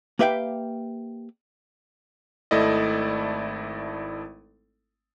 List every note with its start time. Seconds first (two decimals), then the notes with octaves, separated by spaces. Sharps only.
0.19 A#3 G4 B4 E5 F5 G5
2.51 G#1 A3 E4 A4 D5 D#5